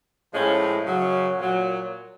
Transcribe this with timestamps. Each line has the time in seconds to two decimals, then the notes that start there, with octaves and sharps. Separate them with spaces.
0.33 A2 F3 G#3 C#4
0.86 F#2 C#3 F#3
1.37 A#2 F#3